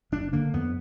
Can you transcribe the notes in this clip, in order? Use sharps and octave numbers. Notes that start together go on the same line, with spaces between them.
F#1 D4
D3 A#3
F2 B3